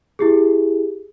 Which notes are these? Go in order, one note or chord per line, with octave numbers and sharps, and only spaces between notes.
E4 G4 G#4